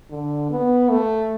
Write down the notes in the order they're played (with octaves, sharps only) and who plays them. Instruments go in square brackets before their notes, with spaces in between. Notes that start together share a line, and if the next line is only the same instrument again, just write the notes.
[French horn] D3
B3
A3